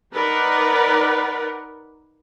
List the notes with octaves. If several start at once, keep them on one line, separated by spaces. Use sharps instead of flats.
D#4 A#4 B4 D5 F#5